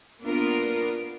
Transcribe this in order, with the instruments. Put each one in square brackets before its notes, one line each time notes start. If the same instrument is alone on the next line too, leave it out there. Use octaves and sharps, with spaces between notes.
[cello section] A#3 B3 D4 F4 A#4